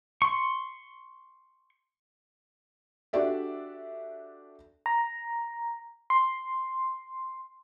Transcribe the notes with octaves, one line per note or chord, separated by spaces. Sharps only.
C6 C#6
D4 F#4 G4 A4 D5 E5
A#5
C6